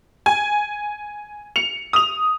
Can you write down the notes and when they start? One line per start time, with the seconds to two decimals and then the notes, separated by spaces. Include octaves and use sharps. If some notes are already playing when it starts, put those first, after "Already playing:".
0.26 G#5
1.56 C#7 F7
1.93 D#6 F7